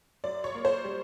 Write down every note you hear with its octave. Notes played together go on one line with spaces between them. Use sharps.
F#2 D5
C#5
A#3
C5
G3